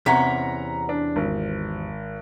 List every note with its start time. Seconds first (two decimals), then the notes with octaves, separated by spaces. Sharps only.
0.06 E2 C3 C#4 F#5 A#5 B6
0.89 D4
1.16 G#1